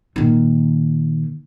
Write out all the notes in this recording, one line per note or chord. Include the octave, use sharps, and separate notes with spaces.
A#2 D#3